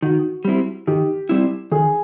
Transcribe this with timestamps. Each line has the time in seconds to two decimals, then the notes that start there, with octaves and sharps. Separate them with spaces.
0.02 D#3 F#4
0.45 G3 C4 E4
0.87 D#3 G4
1.29 G3 C4 E4
1.71 D#3 G#4